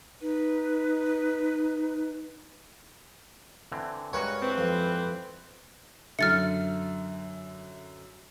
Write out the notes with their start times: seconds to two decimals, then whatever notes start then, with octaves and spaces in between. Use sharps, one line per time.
0.22 D#4 B4
3.72 D3 E3 C4
4.13 G2 G#3 F#4 A#4 B4 C#5 C#6
4.42 E3 C4 B4
4.58 F2
6.19 F#2 D3 E5 F6 A6 C#7